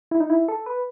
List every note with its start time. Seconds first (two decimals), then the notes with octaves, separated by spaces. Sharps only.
0.11 E4
0.20 D#4
0.30 E4
0.48 A4
0.66 B4